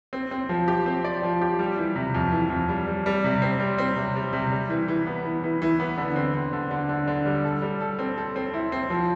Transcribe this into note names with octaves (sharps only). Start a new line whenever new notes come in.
C4
C4
F3
G4
C4
D5
F3
G4
G3
E3
C3
F2
E3
F2
G3
G3
G3
C3
C4
G3
C4
C3
G3
C3
G3
E3
E3
B3
E3
E3
E3
B3
D3
C4
D3
D3
D3
D3
D3
G3
A4
G3
A4
C4
A4
C4
E4
C4
F3